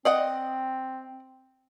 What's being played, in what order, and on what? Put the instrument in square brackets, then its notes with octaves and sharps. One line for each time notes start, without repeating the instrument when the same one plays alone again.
[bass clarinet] C4 [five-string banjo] D5 D#5 F#5